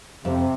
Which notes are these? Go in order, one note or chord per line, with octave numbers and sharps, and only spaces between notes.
F2 C3